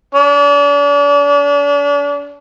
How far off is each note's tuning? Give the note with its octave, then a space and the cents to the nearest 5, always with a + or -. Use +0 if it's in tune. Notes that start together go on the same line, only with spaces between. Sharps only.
D4 -40